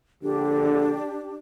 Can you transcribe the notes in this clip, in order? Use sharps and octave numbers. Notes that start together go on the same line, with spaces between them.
A#1 D3 D4 G4